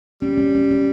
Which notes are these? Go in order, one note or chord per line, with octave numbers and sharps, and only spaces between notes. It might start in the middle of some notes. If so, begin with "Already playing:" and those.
G3 C#4
C#4
C#4
C#4